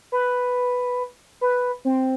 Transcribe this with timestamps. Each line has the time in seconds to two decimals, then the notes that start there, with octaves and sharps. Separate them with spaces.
0.12 B4
1.41 B4
1.85 C4